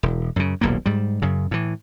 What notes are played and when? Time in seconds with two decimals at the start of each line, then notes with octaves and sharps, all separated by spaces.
0.03 E1
0.36 F#2 C#3
0.61 D#1 B1 A2 A#3
0.86 G#2 G3
1.22 F#2 C#3
1.51 A2 E3